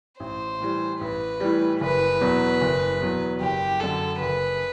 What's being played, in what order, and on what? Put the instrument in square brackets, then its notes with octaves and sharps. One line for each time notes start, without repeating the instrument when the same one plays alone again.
[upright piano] A1 [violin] C5
[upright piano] A2 E3 G3
[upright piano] A1 [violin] B4
[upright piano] A2 E3 G3
[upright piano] F#1 [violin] B4
[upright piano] E2 B2 F#3
F#1
E2 B2 F#3
[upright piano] F#1 [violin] G4
[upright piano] F#2 D3 [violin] A4
[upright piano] F#1 [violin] B4